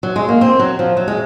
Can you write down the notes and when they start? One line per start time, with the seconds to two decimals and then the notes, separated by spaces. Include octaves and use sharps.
0.03 F#3
0.16 G#3
0.28 A#3
0.41 C4
0.59 F#3
0.79 F3
0.97 F#3
1.08 G#3